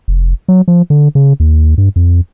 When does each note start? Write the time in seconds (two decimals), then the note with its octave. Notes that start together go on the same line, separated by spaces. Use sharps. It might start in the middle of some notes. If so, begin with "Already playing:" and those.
0.08 F1
0.48 F#3
0.68 F3
0.90 D3
1.15 C#3
1.40 D#2
1.78 G2
1.96 F2